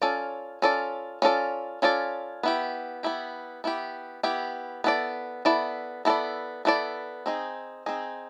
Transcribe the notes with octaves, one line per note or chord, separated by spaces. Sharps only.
C#4 F4 A4 D5
C#4 F4 A4 D5
C#4 F4 A4 D5
C#4 F4 A4 D5
B3 E4 G4
B3 E4 G4
B3 E4 G4
B3 E4 G4
B3 E4 A4 D5
B3 E4 A4 D5
B3 E4 A4 D5
B3 E4 A4 D5
C4 D#4 G#4
C4 D#4 G#4